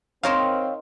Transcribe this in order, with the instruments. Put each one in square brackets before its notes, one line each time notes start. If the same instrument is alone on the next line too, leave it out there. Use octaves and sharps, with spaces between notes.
[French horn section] C4 [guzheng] D#4 A#4 C5 [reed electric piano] C#5 F5